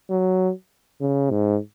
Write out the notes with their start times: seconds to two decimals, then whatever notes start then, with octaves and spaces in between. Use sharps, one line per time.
0.10 F#3
1.00 C#3
1.31 G#2